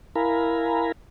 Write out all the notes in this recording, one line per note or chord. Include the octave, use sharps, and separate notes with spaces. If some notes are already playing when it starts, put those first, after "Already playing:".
E4 A#4 F5 G#5 A#5 B5